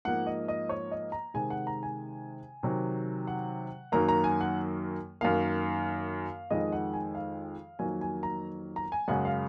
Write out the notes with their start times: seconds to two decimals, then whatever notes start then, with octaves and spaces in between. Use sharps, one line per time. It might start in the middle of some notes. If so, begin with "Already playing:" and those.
0.05 G#2 F3 A#3 F#5
0.27 D#5
0.48 D#5
0.69 C#5
0.91 D#5
1.12 A#5
1.34 C3 D#3 G#3 G#5
1.50 F#5
1.67 A#5
1.83 G#5
2.63 C3 D#3 F#3
3.27 F#5
3.92 F#2 D#3 F#3 A#3 A#5
4.09 A#5
4.24 G#5
4.41 F#5
5.21 F#2 D#3 A#3 F5
6.51 F2 D#3 G#3 D#5
6.72 F#5
6.94 G#5
7.15 F5
7.79 F2 D#3 F#3 A#3 G#5
8.01 G#5
8.23 A#5
8.76 A#5
8.92 G#5
9.08 F#2 C#3 G#3 F#5
9.25 F5